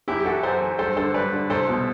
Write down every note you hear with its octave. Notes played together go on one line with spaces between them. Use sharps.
F#2 E4 G4
G4
E3 F#4 A4
F#2 A4 C5
E3
G2 A4 C5
D3 A4 C5
G2 B4 D5
D3
C2 A4 C5
B2